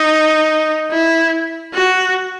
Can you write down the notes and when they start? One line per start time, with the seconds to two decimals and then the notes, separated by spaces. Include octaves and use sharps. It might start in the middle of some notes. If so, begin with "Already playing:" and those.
Already playing: D#4
0.91 E4
1.74 F#4